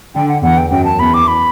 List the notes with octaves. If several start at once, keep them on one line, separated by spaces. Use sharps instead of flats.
D3 G5
F#5
E2 F#5
G5
F#2 G5
A5
E2 B5
D6
B5